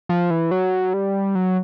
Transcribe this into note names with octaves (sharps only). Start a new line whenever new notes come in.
F3
E3
F#3
G3
F#3